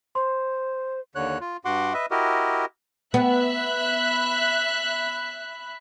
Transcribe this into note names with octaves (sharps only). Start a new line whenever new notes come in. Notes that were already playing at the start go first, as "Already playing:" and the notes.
C5 C6
D#2 D3 C#5 F#6
F4
G2 F#4 F#5 C6 D6
B4 D#5 E5
E4 F#4 G4 A#4 D#5
B3 E5 B5 F#6